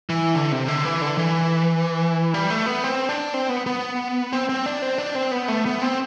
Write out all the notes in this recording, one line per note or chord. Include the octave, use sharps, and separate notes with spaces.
E3
D3
C3
D3
E3
D3
E3
G3
A3
B3
C4
D4
C4
B3
B3
C4
C4
D4
C4
D4
C4
B3
A3
B3
C4